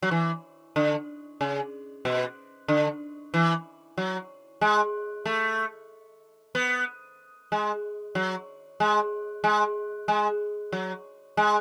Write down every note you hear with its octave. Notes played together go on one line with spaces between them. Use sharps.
F#3
E3
D3
C#3
B2
D3
E3
F#3
G#3
A3
B3
G#3
F#3
G#3
G#3
G#3
F#3
G#3